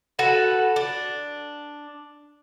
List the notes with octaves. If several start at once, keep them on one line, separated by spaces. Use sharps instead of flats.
F#4 A4 B4 F#5
D4